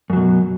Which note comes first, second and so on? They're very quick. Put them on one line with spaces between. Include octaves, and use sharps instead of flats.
F#2 F#3 B2